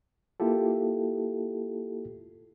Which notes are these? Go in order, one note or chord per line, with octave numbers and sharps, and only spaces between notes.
A#3 E4 F4 G4 A4